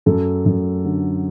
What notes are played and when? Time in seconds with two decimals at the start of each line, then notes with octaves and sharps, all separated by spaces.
0.06 F#2 A4
0.46 F#2
0.85 D3